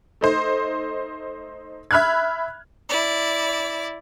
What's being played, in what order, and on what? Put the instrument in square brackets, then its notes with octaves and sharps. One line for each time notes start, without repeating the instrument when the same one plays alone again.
[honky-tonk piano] A3 D#4 C5
E5 B5 F6 F#6 G#6
[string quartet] E4 D5